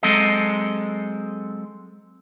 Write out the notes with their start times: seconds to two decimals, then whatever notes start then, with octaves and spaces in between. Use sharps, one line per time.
0.03 F#3 G#3 C4 A4 D#5